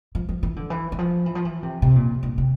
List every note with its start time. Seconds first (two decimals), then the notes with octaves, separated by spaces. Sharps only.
0.15 F3
0.29 F3
0.43 E3
0.56 D3
0.70 E3
0.92 E3
0.99 F3
1.26 E3
1.35 F3
1.45 E3
1.63 C3
1.82 C3
1.96 A#2
2.23 G2
2.38 C3